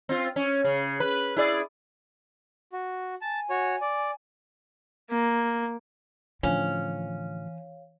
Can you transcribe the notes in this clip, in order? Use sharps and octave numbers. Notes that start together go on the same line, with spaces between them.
C4 F4
C#4
C#3
B4
E4 G#4 D5
F#4
G#5 A5
F#4 C#5
D5
A#3
A2 D3 E3 F3 C#4 C#5 F5